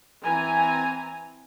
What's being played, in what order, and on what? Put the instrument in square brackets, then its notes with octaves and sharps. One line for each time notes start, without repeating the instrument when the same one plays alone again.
[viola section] E3 C4 G#5 A#5